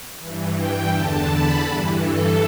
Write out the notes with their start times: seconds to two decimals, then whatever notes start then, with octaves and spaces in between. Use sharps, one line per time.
0.19 G2 E3
0.56 G5
0.92 E2 D3 A5
1.29 B5
1.66 G2 E3
2.02 A4